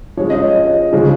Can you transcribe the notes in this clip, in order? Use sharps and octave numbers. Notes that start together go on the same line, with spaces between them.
F3 G#3 C#4 C#5
D#5
C#5
D#5
C#3 F3 G#3 C#4